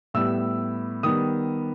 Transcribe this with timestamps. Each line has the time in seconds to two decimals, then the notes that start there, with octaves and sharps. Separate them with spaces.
0.14 A2 G3 B3 E6
1.03 D#3 G3 B3 D#6